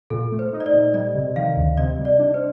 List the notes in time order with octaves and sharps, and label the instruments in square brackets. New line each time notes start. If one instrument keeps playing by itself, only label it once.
[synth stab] A#2 [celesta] A4
[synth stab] A3
[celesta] C5
[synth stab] D#4
[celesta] D#5
D5
[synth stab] A#2
[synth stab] G3 [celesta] D#5
[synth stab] C3
[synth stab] D#3 [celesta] F5
[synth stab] D2
[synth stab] C3 [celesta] D#5
[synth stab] G3
[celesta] D5
[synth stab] D4
[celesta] C5